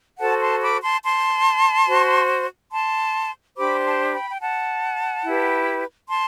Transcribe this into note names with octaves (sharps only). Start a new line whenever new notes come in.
F#4 A4 C5 F#5 A5
A5 C6
B5 D6
A5 C6
A5 C6
F#4 C5
A5 C6
D4 G4 C5 B5 D6
A5 C6
G5 B5
G5
F#5 A5
E4 G4 B4
A5 C6